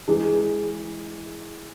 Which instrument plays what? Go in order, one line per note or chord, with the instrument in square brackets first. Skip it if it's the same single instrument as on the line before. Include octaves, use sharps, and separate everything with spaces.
[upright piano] E3 G#3